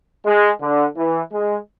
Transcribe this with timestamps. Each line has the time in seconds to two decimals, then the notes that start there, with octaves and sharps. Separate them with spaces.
0.26 G#3
0.61 D3
0.97 E3
1.33 G#3